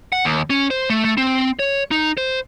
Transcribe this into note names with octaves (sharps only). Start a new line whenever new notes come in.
F#5
D#2
C#4
C5
A3
A3
C4
C#5
D#4
C5